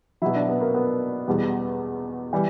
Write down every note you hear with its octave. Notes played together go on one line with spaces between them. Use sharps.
B2 F#3 E4
D4
B3
A#3
B3
E2 B2 G3
E3 G3